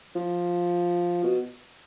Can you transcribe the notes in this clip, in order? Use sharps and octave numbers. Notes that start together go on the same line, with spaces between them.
F3
B2